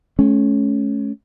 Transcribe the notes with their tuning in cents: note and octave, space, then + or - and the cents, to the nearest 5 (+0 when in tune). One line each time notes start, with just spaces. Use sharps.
A3 -40 C#4 +0